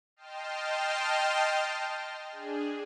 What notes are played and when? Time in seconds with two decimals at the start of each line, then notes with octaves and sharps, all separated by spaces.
0.17 D#5 G5 A5 C6 F6
2.30 D4 G#4